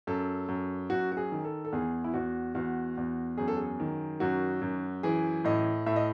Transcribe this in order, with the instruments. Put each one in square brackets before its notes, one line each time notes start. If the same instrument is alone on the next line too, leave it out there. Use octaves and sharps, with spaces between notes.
[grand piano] F#2 A4
F#2
F#2 F#4
F#4
G#4
D#3
A4
A4
E2 G#4
E4
E2 F#4
E2 F#4
E2
F#2 G#4
A4
G#4
D#3
F#2 F#4
F#2
E3 G#4
A2 D#5
A2 E5
D#5